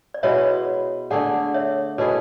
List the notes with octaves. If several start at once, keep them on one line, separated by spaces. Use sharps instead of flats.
D5
B2 G#3 B3 E4 C#5 E5
D3 A3 D4 G#4 D5 F#5
C#5 E5
B2 A3 E4 G#4 A4 C#5